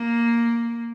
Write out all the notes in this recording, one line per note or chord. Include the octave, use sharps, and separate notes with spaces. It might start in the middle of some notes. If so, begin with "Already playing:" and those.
Already playing: A#3